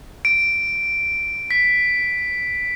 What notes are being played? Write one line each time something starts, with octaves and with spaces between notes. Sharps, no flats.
D7
B6